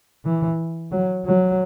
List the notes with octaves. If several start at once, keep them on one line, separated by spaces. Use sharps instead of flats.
E3
F#3
F#3